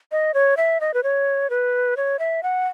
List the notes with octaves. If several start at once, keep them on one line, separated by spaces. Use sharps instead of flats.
D#5
C#5
E5
D#5
B4
C#5
B4
C#5
E5
F#5